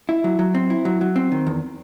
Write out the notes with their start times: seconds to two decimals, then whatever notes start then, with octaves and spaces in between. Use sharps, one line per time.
0.09 E4
0.24 F#3
0.39 F#3
0.54 C4
0.70 E4
0.85 F#3
1.01 F#3
1.16 C4
1.32 D#3
1.47 E2